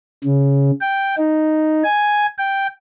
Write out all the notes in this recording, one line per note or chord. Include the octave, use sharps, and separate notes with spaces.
C#3
G5
D#4
G#5
G5